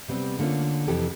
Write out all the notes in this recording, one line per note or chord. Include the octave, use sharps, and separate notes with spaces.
C3 G3 B3 C4
D3 A3 A#3 C#4 F4
F2 C3 E3 G4 A4